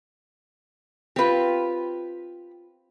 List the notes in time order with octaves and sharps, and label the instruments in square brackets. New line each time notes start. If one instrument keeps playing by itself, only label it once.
[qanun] C4 F4 [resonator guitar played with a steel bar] G4 B4